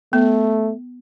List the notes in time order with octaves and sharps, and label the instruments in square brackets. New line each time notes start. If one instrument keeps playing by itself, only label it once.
[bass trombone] A3 [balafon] B3